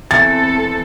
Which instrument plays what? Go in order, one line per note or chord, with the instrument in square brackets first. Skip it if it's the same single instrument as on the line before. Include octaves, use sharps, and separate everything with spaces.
[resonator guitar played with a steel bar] E2 [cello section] C4 A4 [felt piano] A6